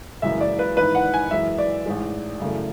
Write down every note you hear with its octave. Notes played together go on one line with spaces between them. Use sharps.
F#1 F#2 C#3 E3 G#3 E5
D5
B4
G#1 G#2 E3 B4
F#5
G#5
F#2 E3 G#3 E5
D5
A1 G#2 G#3
F#2 C#3 E3 A3